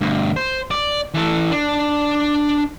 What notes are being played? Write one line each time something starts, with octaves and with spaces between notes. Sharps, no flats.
D2 G2
C5
D5
E3 A4
D4